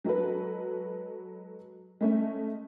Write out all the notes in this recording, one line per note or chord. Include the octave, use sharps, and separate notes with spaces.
F#3 G#3 F#4 A4 B4
G#3 A3 C#4